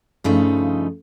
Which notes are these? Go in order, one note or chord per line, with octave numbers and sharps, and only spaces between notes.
G2 C#3 F3 A3 D#4